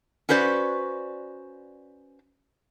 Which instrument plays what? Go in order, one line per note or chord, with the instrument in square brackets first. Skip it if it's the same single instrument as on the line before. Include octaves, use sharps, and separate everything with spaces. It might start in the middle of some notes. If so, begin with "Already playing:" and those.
[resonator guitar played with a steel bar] C#4 F#4 B4 C5 D5